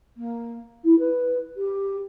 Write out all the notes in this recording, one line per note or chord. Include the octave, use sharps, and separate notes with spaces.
A#3
E4
B4
G4